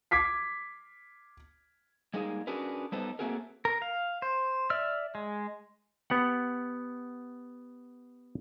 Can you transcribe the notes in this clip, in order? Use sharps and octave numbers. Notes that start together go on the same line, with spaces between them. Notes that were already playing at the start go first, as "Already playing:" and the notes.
D6 G#6 B6 C7
G3 G#3 A#3 D#4 G#4
C#4 D4 F#4 G#4 A#4 B4
G3 B3 D#4 A4 B4 C5
A3 A#3 C4 F#4 G#4 A#4
A#4
F5
C5
D5 E5 E6 F6
G#3
B3 G4 F#5